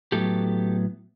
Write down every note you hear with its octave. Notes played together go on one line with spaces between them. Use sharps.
A2 F#3 B3 G4 A4